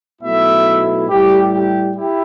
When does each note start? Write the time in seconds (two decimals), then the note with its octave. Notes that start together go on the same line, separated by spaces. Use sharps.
0.21 B1 B2 A3 E4 E5
1.07 A2 G3 E4 G4
1.50 G4
1.94 E4 G4